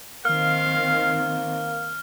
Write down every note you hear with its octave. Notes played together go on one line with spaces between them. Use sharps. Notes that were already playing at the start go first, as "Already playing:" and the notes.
D#3 A#3 C4 F5 F6